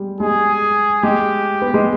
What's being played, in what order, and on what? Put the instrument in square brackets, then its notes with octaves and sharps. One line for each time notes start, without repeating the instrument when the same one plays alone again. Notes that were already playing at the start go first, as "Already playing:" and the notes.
Already playing: [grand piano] G3 G#3
[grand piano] G#3 [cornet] G#4
[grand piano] G#3 [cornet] G4
[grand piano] B3
G#3